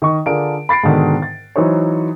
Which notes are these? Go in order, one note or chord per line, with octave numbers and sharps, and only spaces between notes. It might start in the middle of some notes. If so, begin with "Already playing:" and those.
D#3 D#5 C#6
D3 D4 F4 G#4 A#4 D7
B5 A6 C7 D7
G#2 B2 D3 D#3
A6
E3 F#3 D#4 C5 C#5